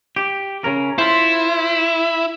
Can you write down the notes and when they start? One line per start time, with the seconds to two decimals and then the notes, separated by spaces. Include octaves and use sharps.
0.16 G4
0.64 C#3 C#4 A#4
0.98 E4 F4 C5